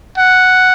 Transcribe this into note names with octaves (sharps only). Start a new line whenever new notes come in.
F#5